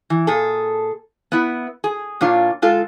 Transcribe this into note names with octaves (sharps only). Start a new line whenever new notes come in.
E3
A#2 G#4 A4
B3 E4
G#4
A#2 D4 F4 C#5
G#3 F4 A4